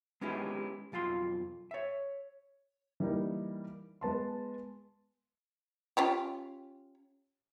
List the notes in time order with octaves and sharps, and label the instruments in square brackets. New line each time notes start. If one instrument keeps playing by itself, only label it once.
[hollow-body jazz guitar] G#3 B3 C#4 D#4 E4 G4
B1 F2 F4 F5 C6
C#5 E5
[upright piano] E3 G3 A#3 D#4
G#3 B3 A5 C6
[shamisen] C#4 F4 G4